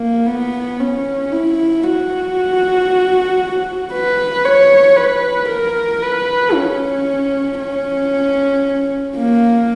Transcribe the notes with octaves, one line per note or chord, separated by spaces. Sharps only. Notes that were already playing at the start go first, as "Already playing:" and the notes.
Already playing: A#3
B3
C#4
E4
F#4
B4
C#5
B4
A#4
B4
C#4
C#4
A#3